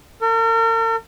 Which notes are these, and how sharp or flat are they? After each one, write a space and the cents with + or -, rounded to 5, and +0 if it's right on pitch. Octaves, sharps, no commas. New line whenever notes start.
A#4 -45